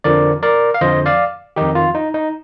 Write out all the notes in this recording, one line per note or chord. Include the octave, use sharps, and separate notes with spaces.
F2 D3 F3 A#4 D5
A#4 D5
F5
F2 D3 F3 C5 D#5
D5 F5
F2 D#3 D#4 G4
F4
D#4
D#4